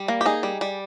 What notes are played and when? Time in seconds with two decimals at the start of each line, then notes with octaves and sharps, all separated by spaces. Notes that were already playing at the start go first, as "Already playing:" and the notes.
Already playing: G3
0.08 A#3
0.21 G4
0.26 D#4 G#4
0.43 G3
0.61 G3